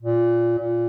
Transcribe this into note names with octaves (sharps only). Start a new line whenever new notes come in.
A#2
A#2